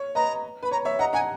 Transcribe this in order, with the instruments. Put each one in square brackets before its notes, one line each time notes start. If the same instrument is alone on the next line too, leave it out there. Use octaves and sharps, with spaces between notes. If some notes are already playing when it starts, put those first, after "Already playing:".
Already playing: [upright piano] C#5
[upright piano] B4 D#5 [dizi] A#5
[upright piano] B4 [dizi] B5
[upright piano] C#5 [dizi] A#5
[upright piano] C#5 E5
[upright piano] D#5 F#5 [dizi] A#5
[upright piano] F#5 A#5 [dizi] G#5